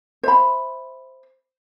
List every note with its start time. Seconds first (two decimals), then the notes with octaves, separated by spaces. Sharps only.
0.23 C5 E5 B5